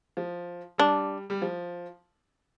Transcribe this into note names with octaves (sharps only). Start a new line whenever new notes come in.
F3
G3 D4
G3
F3